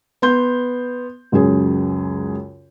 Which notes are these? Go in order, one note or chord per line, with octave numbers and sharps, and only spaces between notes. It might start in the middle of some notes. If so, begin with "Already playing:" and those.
B3 C6 G6
C#2 F#2 C#4 G#4